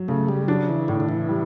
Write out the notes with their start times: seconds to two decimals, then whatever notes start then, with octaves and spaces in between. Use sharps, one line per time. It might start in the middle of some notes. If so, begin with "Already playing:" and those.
Already playing: F#3
0.08 C#3 A3
0.28 G3
0.48 F#3 D4
0.69 E3
0.88 A2 D3
1.00 D3
1.09 E3
1.28 G3